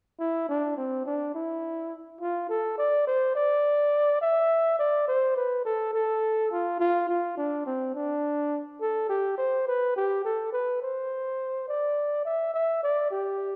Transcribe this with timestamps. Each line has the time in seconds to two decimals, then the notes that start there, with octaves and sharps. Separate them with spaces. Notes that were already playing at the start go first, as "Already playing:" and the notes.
0.19 E4
0.49 D4
0.77 C4
1.06 D4
1.35 E4
2.21 F4
2.49 A4
2.78 D5
3.07 C5
3.35 D5
4.21 E5
4.79 D5
5.08 C5
5.36 B4
5.65 A4
5.94 A4
6.51 F4
6.80 F4
7.09 F4
7.37 D4
7.66 C4
7.95 D4
8.81 A4
9.09 G4
9.38 C5
9.67 B4
9.96 G4
10.25 A4
10.53 B4
10.82 C5
11.68 D5
12.25 E5
12.54 E5
12.83 D5
13.11 G4